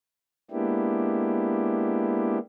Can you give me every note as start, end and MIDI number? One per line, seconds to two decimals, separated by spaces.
0.51 2.39 56
0.51 2.39 58
0.51 2.39 59
0.51 2.39 62
0.51 2.39 64
0.51 2.39 67